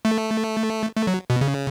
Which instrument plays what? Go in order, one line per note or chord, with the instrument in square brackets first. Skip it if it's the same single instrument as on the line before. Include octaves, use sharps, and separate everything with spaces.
[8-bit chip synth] A3
A3
F#3
B2
C#3